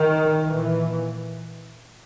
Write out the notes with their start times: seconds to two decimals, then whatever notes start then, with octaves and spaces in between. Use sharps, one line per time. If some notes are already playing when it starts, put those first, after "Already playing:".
Already playing: D#3
0.48 A#2 E3